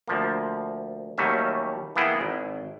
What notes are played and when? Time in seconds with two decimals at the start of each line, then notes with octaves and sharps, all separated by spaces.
0.08 D2 F3 A#3
1.18 D#2 F#3 G3 A3 C#4 E5
1.96 E3 A#3 B3 E4 G#4 G5
2.21 G#1